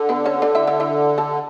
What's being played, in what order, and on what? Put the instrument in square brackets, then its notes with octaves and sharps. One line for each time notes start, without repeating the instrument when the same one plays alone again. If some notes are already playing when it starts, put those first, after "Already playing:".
Already playing: [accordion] D3
[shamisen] B3 B4
C#4 C#5
D4 D5
E4 E5
E4 E5
E4 E5
A4 A5